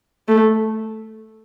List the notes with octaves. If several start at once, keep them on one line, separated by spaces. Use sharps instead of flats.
A3